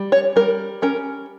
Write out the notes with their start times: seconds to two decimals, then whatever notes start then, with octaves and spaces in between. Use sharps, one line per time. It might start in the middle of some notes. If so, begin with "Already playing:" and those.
Already playing: G3
0.12 C#5
0.36 G3 A#4
0.82 C#4 A#4